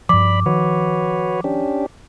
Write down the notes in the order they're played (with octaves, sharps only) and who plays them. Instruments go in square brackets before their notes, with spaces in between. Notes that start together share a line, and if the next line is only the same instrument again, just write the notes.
[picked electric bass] G2 F3 [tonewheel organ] D5 B5 [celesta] D6
[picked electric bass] D#3 F3 [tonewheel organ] F#4 B4 C#5
[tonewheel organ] C#4 D4 G4